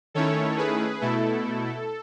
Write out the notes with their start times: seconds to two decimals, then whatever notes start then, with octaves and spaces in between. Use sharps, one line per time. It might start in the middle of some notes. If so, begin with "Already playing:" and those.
0.14 D#3 A3 C#4 E4 A4 C#5
0.57 G#4 B4
1.01 B2 A3 E4 A4